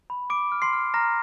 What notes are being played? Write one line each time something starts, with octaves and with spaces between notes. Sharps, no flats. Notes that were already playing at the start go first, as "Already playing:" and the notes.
B5
D6 D7
F6
C6 C7
F6
A#5 F6 A#6